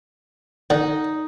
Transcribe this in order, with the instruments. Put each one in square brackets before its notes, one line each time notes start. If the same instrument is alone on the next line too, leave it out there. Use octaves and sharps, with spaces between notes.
[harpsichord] D3 [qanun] D#4